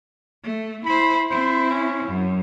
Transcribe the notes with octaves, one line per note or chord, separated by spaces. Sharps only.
A3
E4 C5 B5
C4 E4 C5
C#4
F#2